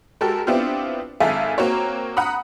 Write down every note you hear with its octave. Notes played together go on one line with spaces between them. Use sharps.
G#3 F#4 G4 A4 A#4
B3 C4 D4 E4 F4 G4
G#1 G#2 A4 E5 F5 G#5
A#3 C4 F#4 C#5
F#5 A#5 B5 D#6